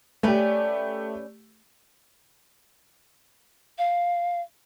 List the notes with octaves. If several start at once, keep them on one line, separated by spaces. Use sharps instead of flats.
A3 C#4 G4 B4 D5
F5